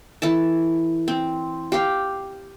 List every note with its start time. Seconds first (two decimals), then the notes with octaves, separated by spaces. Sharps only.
0.22 E3 A4 A5
1.08 C4
1.72 G4 F5